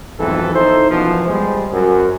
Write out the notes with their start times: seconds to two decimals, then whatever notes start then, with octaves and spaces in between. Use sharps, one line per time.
0.20 B1 F2 G#2 E3 A4
0.55 D#4 E4 A4 C5
0.91 F#2 B2 E3 F3
1.26 G3 G#3 C5
1.72 F#2